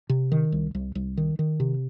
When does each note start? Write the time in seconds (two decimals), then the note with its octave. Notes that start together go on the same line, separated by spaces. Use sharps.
0.09 C3
0.32 D#3
0.52 C2
0.75 C2
0.95 C2
1.17 D#3
1.39 D#3
1.60 C3